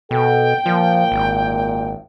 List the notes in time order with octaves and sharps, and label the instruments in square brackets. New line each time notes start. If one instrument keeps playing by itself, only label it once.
[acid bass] B2 [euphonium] A4 [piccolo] G5
[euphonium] A#2 [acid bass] F3
[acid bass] G#1